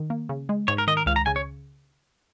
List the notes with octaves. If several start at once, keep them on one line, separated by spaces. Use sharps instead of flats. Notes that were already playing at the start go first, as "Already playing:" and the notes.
Already playing: D#3
A#3
C#3
G#3
G#2 C#5
A#4
D#3 D#5
A#4
C#2 F5
A#5
C#3 G#5
C#5